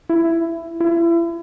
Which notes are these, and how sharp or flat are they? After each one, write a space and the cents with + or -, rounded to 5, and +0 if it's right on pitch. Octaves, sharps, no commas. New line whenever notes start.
E4 +15
E4 +35